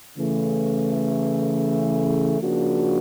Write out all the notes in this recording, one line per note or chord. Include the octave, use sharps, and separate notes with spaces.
C#3 E3 A3
C#3 F3 A#3 D4 F#4